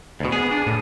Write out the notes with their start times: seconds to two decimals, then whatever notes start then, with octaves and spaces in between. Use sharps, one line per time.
0.20 D2 B2
0.32 B3 G#4
0.51 D4
0.67 A2